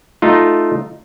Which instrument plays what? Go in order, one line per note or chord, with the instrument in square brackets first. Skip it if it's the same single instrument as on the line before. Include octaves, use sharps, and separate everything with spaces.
[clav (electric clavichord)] A3 D#4 F4